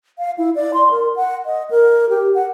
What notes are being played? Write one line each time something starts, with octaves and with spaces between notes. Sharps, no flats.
F5
E4
D5
C6
A#4
F#5
D#5
A#4
G4
F#5